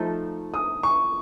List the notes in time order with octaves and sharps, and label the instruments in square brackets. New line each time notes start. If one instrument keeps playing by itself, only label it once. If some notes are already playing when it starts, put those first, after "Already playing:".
Already playing: [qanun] F3 A3 D#4 A4
[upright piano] D#6
C#6